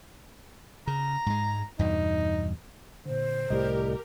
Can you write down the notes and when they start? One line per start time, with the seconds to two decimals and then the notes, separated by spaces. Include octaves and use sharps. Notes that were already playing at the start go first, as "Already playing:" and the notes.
0.87 C#3 A#5
1.26 G#2 G#3
1.79 E2 G2 B2 D#4
3.06 A#2 D3 C5
3.50 C2 A2 G4 A#4 D5 D#5